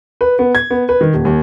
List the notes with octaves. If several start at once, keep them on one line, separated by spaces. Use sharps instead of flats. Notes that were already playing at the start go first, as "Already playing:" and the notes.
B4
B3
G#6
B3
B4
D#3
D#1
D#2